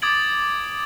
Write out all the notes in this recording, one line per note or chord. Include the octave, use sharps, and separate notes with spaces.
D6 D#6 G#6 A6 D7 F#7